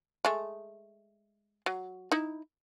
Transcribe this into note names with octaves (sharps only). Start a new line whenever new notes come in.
G#3 A3
F#3
D#4 E4